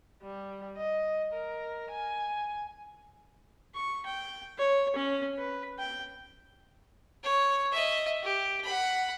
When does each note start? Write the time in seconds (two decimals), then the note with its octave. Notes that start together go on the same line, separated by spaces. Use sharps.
0.22 G3
0.77 D#5
1.33 A#4
1.90 G#5
3.75 C#6
4.06 G5
4.58 C#5
4.95 C#4
5.38 B4
5.79 G5
7.23 C#5
7.72 D#5 E5
8.23 G4
8.64 F#5 B5